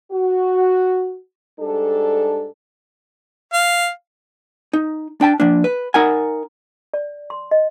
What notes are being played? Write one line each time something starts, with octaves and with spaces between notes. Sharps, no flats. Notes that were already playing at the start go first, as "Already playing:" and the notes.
F#4
G#2 G3 D4 A4
F5
D#4
D4 G5 A5
F3 A#3 D4
B4
D#4 A#4 F#5 G#5
D5
C6
D#5